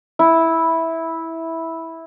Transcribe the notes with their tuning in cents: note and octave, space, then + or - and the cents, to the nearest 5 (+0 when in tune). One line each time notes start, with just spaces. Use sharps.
E4 -10